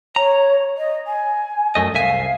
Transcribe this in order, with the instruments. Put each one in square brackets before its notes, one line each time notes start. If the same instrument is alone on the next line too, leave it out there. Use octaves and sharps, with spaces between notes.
[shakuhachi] C#5 [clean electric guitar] A#5
[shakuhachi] D#5
G#5
[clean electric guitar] F#2 A3 D#5
[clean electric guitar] C2 E5 G#5 [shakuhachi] F5